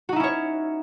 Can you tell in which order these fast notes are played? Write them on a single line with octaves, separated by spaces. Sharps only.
F#4 D#4 E4 C#4 C#5